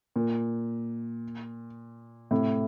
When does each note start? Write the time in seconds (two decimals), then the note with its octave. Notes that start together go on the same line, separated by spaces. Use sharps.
0.16 A#2
2.31 A2 C3